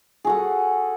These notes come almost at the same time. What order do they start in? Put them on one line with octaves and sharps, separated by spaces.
G#4 F#4 A4